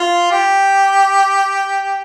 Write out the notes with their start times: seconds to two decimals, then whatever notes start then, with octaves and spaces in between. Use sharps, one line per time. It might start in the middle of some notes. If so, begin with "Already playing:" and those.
Already playing: F4
0.32 G4